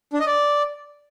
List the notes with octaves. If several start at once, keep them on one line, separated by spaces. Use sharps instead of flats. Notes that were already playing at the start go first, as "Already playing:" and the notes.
D4
D#5
D5